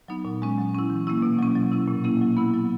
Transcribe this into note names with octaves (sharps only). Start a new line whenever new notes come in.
F#3 B3 D#4
A#2
G#3 C#4
F#3
C#4 E4
E3
A#3 C#4 E4
B2
F#3 C#4
F#3
C#4 E4
A#2
A#3 C#4 E4
F#3
B3 E4
F#3